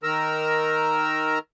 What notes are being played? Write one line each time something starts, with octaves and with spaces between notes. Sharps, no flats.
D#3 A#4 A#5 E6